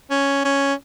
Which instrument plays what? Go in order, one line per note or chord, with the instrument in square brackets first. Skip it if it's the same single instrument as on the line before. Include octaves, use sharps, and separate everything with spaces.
[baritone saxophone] C#4
C#4